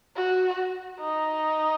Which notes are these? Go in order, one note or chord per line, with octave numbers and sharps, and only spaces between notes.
F#4
D#4